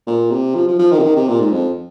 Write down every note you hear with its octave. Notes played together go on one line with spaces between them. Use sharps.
A#2
C3
F3
F3
F3
D#3
C3
D#3
C3
A#2
G#2
F2